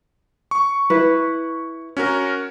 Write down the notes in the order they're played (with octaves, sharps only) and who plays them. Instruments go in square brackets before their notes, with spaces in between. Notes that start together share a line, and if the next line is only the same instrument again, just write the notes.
[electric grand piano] C#6
[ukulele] E4 B4
[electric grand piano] C#4 F#4 A#4